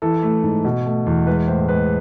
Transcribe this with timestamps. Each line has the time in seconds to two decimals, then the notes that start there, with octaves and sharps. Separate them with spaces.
0.02 E3 A4
0.23 A3
0.43 G#2
0.65 B2
0.86 A3
1.06 E2
1.27 G#3 B4
1.48 A2 C5
1.68 G#3 B4